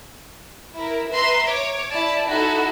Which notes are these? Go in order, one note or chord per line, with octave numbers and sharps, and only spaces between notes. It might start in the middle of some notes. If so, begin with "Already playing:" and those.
E4 A#4
B4 E5 A#5 C6
C#5 D6
E4 D5 A5
D#4 E4 F#4 A4 F#5